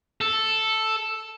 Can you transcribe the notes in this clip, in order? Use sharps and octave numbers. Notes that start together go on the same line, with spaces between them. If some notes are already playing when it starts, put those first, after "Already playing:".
A4